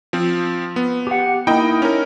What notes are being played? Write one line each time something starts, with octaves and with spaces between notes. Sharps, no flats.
F3 C4
B3
G4 F#5
A#3 D#4 E4 D#5 G5
C#4 A#4